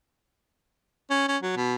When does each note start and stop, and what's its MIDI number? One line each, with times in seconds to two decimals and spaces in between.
1.10 1.24 61
1.28 1.37 61
1.43 1.53 54
1.56 1.75 47